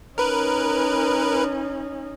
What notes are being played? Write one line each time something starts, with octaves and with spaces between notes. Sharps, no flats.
C#4 D#4 A#4 B4